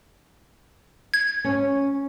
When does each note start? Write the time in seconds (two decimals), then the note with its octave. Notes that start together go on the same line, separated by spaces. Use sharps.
1.14 G#6
1.44 C#4